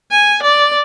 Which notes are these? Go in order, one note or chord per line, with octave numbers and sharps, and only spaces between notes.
G#5
D5